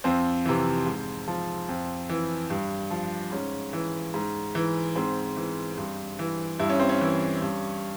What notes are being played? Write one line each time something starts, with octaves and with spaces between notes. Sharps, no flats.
F2 C4
C3 E3
G#2
F3
F2
E3
G2
F3
G#2 C#4
E3
G#2
E3
G#2 C4
E3
G2
E3
G2 E4
C#4
C4
C#4
E3
G2